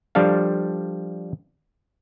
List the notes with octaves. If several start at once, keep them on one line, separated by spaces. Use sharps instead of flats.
F3 G3 D4 A4 F5